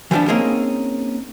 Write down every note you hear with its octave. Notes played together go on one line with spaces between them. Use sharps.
E3 F3 G3 B3 D4
A#3 C4 C#4 D#4 G#4 A#4